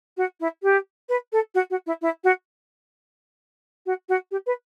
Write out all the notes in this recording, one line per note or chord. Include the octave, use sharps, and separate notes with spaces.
F#4
E4
G4
B4
A4
F#4
F#4
E4
E4
F#4
F#4
F#4
G4
B4